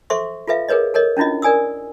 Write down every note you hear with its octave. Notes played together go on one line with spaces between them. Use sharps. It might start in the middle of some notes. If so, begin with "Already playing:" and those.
A4 C5 E5 C6 C#6
F4 A4 B4 E5 F5
G#4 A#4 B4 C#5 D#5
A4 A#4 C#5 D#5
C#4 D4 E4 F4 D#5
A#4 D5 G#5 D#6 E6